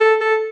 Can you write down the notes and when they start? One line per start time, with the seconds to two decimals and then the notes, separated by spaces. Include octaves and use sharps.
0.01 A4
0.21 A4